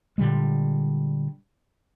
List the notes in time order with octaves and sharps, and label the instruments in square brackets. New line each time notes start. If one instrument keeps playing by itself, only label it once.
[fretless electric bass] A#2 D3 G3 G#3